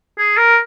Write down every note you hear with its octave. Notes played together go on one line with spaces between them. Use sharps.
G#4
A#4